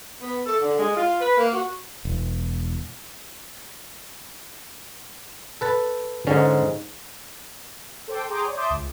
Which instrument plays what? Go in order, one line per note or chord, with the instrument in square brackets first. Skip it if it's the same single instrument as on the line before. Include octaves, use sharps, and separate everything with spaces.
[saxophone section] B3
A4
D3
G#3
F4
B4
A#3
F#4
[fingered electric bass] E1
[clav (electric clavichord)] A4 B4 A5
[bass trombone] G#2 [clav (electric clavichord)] D3 C#4
[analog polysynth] A4 C5 G5 D6
G#4 G5 A#5 C6 D6 D#6
C#5 D5
E5 A5 C6 D6 D#6 G6
C#2